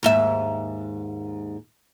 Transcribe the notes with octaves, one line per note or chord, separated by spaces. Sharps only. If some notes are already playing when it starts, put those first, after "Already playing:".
D#2 G#2 E5